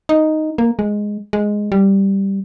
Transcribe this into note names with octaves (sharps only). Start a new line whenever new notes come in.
D#4
A#3
G#3
G#3
G3